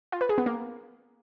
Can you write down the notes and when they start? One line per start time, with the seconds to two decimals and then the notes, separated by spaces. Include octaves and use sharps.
0.12 F4
0.21 B4
0.29 G#4
0.38 B3
0.46 A#3